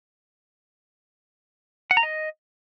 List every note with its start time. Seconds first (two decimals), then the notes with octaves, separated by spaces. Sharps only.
1.91 F#5
1.97 A#5
2.03 D#5